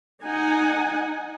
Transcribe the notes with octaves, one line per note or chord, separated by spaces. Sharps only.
D#4 F#5 G#5